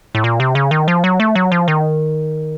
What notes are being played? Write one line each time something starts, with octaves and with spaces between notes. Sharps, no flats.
A2
A#2
C3
C#3
D#3
F3
F#3
A3
F#3
F3
D#3